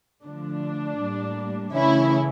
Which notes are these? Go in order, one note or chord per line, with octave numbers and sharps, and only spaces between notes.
D3 F3 A3 D4
A2 G3 A#3
C#3 E3 A3 C#4 E4